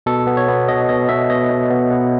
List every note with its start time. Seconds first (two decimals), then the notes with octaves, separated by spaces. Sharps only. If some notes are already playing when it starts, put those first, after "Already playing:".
0.06 B2 A4
0.27 B3
0.37 C#5
0.48 B3
0.68 B2 D#5
0.89 B2 D#5
1.09 B2 E5
1.30 B2 D#5
1.50 B2
1.70 B3
1.91 B3